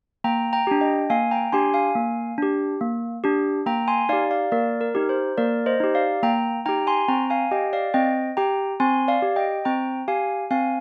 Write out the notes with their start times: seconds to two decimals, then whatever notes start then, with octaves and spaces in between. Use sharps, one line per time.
0.24 A#3 G5 A#5
0.53 G5 A#5
0.67 D4 G4
0.81 D#5 G5
1.10 A#3 F5 G#5
1.31 G5 A#5
1.52 D4 G4 G#5 C6
1.74 F5 G#5
1.95 A#3
2.38 D4 G4
2.81 A#3
3.24 D4 G4
3.66 A#3 G5 A#5
3.88 G#5 C6
4.09 D#4 D5 F5
4.13 G4
4.31 D5 F5
4.52 A#3 A#4 D5
4.81 A#4
4.95 D#4 G4
5.09 C5
5.37 A#3 A#4 D5
5.66 C5 D#5
5.80 D#4 G4
5.95 D5 F5
6.23 A#3 G5 A#5
6.66 D#4 G4 G5 A#5
6.87 G#5 C6
7.08 C4 G5 A#5
7.30 F5 G#5
7.51 G4 D#5 G5
7.73 D5 F5
7.94 C4 D#5 G5
8.37 G4 G5 A#5
8.80 C4 G#5 C6
9.08 D5 F5
9.22 G4
9.36 D#5 G5
9.65 C4 G5 A#5
10.08 G4 F5 G#5
10.51 C4 F5 G#5